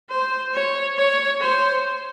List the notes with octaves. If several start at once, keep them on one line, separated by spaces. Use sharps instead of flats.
C5
C#5
C#5
C5